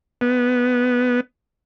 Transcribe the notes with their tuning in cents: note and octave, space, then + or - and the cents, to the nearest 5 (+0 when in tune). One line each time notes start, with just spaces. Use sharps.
B3 +0